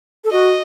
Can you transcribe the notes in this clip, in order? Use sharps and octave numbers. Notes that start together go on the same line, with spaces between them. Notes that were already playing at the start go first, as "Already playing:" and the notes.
A4
F#4 D#5